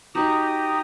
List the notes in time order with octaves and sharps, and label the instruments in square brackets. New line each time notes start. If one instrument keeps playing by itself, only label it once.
[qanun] D#4 F#4 [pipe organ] G4 A#5 D#6